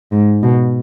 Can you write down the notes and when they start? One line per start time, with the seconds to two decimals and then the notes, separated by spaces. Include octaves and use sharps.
0.12 G#2
0.43 B2